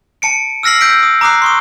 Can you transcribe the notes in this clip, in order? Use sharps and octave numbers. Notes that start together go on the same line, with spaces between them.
A5 C#7 D7
E6 F6 A#6 C7 F#7
E6 G6 B6 D7
D#6
A#5 D6 D#6 F#6 C7
C6 C#6 D#6